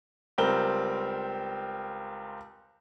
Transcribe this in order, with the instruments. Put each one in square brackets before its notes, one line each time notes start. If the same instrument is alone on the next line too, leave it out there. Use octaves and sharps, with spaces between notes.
[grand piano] C#2 G3 C4 A#4 G7